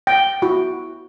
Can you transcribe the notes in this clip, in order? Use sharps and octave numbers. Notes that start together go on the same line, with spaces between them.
G5
E4 F#4